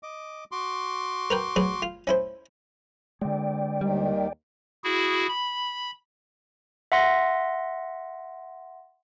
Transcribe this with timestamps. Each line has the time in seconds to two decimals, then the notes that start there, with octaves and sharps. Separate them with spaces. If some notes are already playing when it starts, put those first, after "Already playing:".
0.03 D#5 D6
0.52 F#4 C6 D6
1.31 A#4 B4 G5
1.56 F#3 G#4 B4
1.82 F4
2.07 C#4 E4 C5
3.21 D3 G#3 D5 G5
3.81 D#2 D#3 G3
4.84 E4 F#4 G#4
5.29 B5
6.92 E5 F#5 C6 A#6